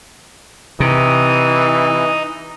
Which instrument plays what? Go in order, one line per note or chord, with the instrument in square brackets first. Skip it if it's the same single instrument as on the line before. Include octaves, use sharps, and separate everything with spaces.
[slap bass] C3 [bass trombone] E3 [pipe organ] D#4 [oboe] D#6